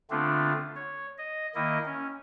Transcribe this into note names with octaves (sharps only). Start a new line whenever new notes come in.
D3 A3 B3 C4 D4 F4
C#5
D#5
D#3 A#3 E4 D#5
C#4